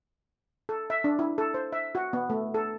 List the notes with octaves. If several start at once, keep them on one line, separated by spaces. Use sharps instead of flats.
A4
E5
D4
E4
A4
C5
E5
F#4
B3
A3
A4